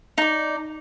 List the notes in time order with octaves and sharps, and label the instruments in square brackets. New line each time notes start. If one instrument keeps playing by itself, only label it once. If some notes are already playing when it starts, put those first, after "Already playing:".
[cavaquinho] D#4 D5